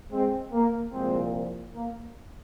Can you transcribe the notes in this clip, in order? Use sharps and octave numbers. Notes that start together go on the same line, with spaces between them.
G#3 C4
A#3
C2 A#2 F3 G#3 C4
A#3